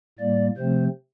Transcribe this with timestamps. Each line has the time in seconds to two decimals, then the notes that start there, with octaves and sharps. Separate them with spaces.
0.19 A2 G3 A#3 D5
0.57 C3 F3 A3 C4 C5